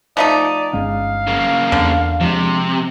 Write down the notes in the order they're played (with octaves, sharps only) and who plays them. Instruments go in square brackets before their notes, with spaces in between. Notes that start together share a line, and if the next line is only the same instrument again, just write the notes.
[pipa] F3 A3 D#4 [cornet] D5
[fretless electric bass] G1 G#3 C#4 [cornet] F5
[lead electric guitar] C#3 A#3
[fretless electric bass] E2 [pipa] D3
[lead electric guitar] C3 [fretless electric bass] F3 G#3